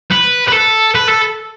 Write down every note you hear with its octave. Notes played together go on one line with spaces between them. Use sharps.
B4
B4
A4
B4
A4